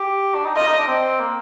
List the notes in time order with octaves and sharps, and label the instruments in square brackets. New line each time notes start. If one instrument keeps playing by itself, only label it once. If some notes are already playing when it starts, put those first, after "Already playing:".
Already playing: [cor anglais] G4
D4
D#4
[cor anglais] F4 [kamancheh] D#5
[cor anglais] D#4
D4
C4
A#3